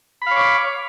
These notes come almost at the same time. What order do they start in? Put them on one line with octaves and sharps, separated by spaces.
B5 F5 C#5 D6